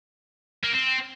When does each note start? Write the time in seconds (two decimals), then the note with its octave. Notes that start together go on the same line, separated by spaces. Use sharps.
0.64 A#3
0.72 C4